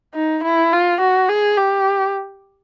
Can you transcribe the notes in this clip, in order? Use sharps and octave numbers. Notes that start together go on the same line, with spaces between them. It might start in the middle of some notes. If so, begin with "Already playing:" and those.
D#4
E4
F4
F#4
G#4
G4